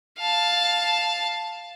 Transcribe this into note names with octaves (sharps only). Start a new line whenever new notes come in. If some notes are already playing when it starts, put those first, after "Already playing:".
F5 A5